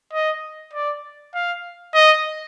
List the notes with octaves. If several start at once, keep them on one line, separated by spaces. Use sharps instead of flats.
D#5
D5
F5
D#5